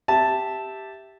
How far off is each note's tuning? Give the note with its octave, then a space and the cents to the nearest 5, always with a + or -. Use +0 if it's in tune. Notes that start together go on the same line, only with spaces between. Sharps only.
G4 +0 E5 -5 A5 +0